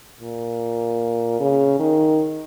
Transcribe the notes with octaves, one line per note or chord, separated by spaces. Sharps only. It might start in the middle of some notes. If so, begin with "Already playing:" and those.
A#2
C#3
D#3